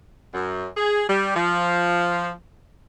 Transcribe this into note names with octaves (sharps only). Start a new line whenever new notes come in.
F#2
G#4
G3
F3